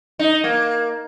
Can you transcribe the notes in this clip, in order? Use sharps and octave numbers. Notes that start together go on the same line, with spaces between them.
D#4
A#3